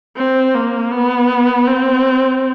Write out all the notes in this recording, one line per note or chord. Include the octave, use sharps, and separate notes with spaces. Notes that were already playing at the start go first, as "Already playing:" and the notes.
C4
A#3
B3
C4